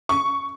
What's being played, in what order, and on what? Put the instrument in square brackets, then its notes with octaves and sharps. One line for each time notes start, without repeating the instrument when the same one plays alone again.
[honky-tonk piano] C#6